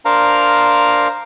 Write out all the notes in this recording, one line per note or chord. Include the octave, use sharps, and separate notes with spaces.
D4 A#4 C5 F5 A#5